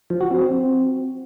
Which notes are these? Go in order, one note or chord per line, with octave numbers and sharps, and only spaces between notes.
F3
F#4
C4
C4